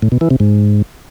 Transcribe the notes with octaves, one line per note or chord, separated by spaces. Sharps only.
A2
B2
E3
C3
G#2